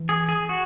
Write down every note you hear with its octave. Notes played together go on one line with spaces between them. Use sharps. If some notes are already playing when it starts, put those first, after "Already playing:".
Already playing: E3
G#4
G#4
F#4